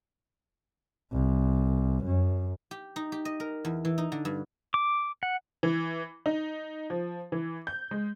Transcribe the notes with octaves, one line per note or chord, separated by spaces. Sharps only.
C2
F#2
G4
D#4
G4
D#5
A#4
E2
E3
D#4
D3
G2
D6
F#5
E3
D#4
F3
E3
G6
G#3